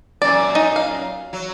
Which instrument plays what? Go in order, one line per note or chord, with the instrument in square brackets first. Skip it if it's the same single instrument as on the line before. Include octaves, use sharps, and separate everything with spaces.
[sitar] F#2 A#2 C4 [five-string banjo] D5
[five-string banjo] D#4
F5
[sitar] F#3